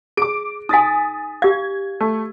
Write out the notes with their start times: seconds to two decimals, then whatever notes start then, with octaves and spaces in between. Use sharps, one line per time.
0.17 G#4 D6 D7
0.69 D#4 G#5 D#6 A6 B6
1.42 G4 F5 G#6
2.01 A3